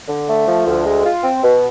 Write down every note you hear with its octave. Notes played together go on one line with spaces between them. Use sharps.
D3
A3
F3
D2
G#3
F4
C4
B2